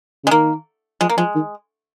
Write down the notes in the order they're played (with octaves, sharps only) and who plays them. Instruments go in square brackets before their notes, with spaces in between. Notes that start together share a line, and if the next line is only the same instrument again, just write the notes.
[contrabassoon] C#3
[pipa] G#3
[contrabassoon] D#3 [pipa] A#3
[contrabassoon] F3 [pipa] G#3
[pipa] A#3
[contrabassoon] F3 [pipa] G#3
[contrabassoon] D#3